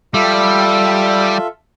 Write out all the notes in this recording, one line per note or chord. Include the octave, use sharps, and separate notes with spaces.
G3 F4 A4 E5